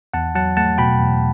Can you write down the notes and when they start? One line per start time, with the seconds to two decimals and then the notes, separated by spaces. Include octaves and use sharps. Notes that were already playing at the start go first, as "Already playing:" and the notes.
0.13 E2 F#5 A5
0.35 F#3 F#5 A5
0.57 A3 F#5 A5
0.78 B2 G5 B5
0.99 E2